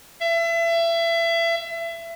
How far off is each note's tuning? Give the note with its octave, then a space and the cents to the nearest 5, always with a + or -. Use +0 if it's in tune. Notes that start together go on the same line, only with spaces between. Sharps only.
E5 +30